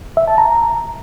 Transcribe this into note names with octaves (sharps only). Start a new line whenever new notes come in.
E5
A5
A#5